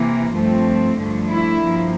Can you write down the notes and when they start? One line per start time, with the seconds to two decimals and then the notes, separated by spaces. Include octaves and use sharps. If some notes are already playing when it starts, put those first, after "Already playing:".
Already playing: C3 E3 A#3
0.33 G2 F3 A3 C4
0.97 G2 D3 F3 A3
1.29 E4
1.60 G2 F3 A#3